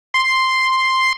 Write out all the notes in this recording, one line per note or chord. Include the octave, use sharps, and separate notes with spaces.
C6